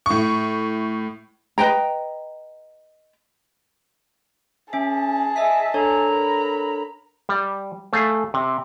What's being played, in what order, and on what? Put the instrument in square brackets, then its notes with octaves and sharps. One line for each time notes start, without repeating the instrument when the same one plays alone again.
[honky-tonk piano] A2 C#6
[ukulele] B4 D#5 G5 A#5
[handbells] C#4 E5 [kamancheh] G#4 A5
[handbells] D#5 G#5 B6 [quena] E5
[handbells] D4 A4 C#5 [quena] A#5
[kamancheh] A#4 B5
[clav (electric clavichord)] G3
A3 G#4 F5
C3